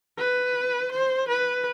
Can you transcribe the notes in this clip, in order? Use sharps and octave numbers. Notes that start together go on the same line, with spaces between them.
B4
C5
B4